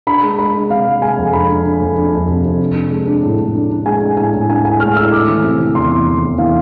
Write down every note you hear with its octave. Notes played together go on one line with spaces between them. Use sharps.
D4 B5
G#3
G#3 B5
D4
C3 F5
G#3
G#3 G#5
F2
D4 B5
D4
D4
F2
D4
F2
C3
C3
D4
D4
G#3
D4
A2
A2
D4
D4
G#3 G#5
D4
A2 G#5
A2
D4 G#5
A2 G#5
G#3 F6
A2 E6
A3 D6
E3
C3
E3
E2 C6
E3
E3
E2
E3 F5